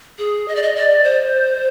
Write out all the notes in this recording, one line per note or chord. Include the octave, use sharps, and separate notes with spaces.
G#4
D#5
D5
D#5
D5
C5